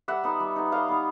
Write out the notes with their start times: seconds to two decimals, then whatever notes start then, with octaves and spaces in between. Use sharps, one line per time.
0.08 G3 E5 F#5
0.24 B3 D#4
0.40 G3
0.56 B3 D#4
0.72 G3 D#5 F5
0.88 B3 D#4